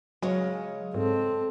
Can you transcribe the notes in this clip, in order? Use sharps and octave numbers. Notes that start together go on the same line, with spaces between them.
C#3 F#3 G#3 C#4
G#2 C4 A4